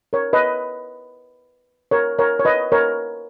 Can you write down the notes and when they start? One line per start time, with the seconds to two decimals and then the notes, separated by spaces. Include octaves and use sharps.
0.13 A#4 C#5
0.33 B4 D#5
1.91 A#4 C#5
2.19 A#4 C#5
2.40 C#5
2.45 B4 D#5
2.72 A#4 C#5